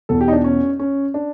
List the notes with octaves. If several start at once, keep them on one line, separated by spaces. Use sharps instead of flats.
E1 E2 B2 A4
G4
D#4
D4
C#4
C#4
D4